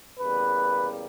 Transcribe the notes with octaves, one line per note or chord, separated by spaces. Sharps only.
E2 C#3 G3 A#3 B4